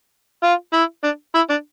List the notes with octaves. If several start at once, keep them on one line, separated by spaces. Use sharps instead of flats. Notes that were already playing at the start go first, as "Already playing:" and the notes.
F4
E4
D4
E4
D4